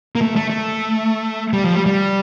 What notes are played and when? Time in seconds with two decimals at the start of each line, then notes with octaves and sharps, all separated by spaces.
0.15 A#3
0.21 A3
0.36 A3
0.50 A3
1.53 G3
1.64 F3
1.75 G3
1.86 G3